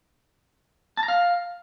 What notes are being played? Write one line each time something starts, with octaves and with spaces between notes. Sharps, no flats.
A5
A#5
F5